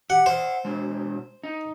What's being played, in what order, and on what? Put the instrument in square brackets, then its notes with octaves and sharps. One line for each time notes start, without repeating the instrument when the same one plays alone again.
[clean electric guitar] G4 [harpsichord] F#5
[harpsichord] C5 [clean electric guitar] E5 F#5
[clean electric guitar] B2 G#3
D#4